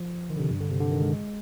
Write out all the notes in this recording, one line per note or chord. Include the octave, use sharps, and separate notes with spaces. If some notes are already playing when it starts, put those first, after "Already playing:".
Already playing: F3
D#3
D3
C3
G2
D3
C3
D3
D#3
G#3